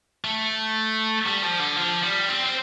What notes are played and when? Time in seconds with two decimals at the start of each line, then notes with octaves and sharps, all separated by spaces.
0.24 A3
1.27 G3
1.43 F3
1.60 D3
1.77 F3
2.03 G3
2.29 C4
2.46 C4